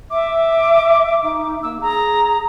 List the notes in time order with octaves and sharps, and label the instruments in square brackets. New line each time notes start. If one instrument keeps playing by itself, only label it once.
[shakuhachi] E5 [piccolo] D6
[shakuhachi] D#4
[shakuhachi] A#3 [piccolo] E6
[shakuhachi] G#4 [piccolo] A#5